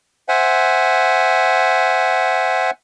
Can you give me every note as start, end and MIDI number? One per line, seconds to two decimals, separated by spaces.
0.29 2.71 72
0.29 2.71 76
0.29 2.71 78
0.29 2.71 80